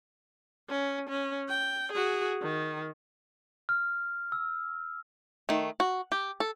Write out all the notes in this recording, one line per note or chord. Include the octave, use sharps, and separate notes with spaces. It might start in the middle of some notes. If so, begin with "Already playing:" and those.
C#4
C#4
G5
F#4 G#4
D#3
F6
E6
D#3 A3
F#4
G4
A4